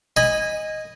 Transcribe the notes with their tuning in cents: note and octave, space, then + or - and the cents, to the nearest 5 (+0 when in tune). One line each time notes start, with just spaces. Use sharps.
D#5 +0 G#5 -20 B5 +0